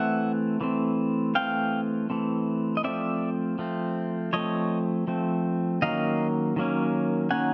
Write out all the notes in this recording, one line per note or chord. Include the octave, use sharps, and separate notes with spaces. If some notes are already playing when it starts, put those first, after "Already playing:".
Already playing: E3 A3 C4 E5 F#5
E3 A3 C4
E3 A3 C4 F5 G5
E3 A3 C4
D#5
F3 A3 C4 D5 E5
F3 A3 C4
F3 A3 C4 C#5 D#5
F3 A3 C4
D#3 F#3 A#3 C#4 D#5 F5
D#3 F#3 A#3 C#4
D#3 F#3 A#3 C#4 F#5 G#5